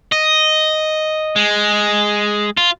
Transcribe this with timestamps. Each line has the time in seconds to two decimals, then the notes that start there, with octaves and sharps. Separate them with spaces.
0.12 D#5
1.36 G#3
2.57 F4